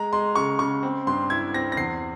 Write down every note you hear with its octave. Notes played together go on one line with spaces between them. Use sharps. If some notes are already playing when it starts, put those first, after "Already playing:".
Already playing: G#3 A#5
G#3 C6
C#3 C#6
C#3 C#6
C4
G2 C6
E4 G#6
C4 A#6
A#6
E2 C7